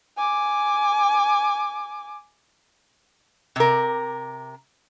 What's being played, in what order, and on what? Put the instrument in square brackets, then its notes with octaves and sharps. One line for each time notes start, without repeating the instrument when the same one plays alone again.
[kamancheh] G#5 D6
[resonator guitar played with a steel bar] C3 A#4